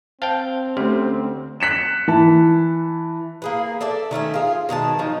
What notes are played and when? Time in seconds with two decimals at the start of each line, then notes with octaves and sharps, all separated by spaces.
0.22 C4 C5 F5 G5 A5
0.77 D2 A3 C#4 G4
1.60 F#6 B6 C#7 E7
2.08 E3 A5
3.42 A#3 G#4 B4
3.81 A4 D5 E5 A5
4.11 D#3 A3 C#4 E5
4.34 F4 G#4
4.69 B2 D#3 G#3 A5
4.99 F3 F#3 D#4